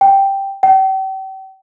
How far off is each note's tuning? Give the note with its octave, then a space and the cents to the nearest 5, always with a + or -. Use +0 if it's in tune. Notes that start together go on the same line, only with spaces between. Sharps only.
G5 +0
G5 -40